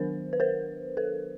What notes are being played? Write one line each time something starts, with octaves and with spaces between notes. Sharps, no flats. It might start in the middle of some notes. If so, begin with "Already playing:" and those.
Already playing: D#3 F#3 B3 D4 A#4 C5
B4
A#4 C5
A4 B4